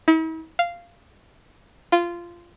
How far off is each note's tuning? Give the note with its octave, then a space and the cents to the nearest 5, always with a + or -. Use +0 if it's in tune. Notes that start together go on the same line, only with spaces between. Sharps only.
E4 -45
F5 -10
F4 -15